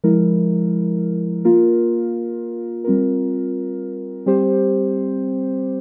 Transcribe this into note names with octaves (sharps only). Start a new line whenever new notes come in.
F3 G#3 E4 A#4
A#3 F4 A#4
G3 C4 F4 A#4
G3 C4 G4 C5